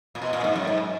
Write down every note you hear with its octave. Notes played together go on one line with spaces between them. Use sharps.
A#2
B2
A#2
G#2
F#2
G#2